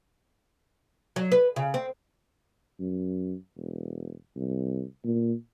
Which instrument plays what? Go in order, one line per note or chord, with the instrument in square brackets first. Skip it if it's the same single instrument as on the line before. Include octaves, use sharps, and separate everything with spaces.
[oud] F#3
B4
C#3
C4
[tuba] F#2
E1
C2
A#2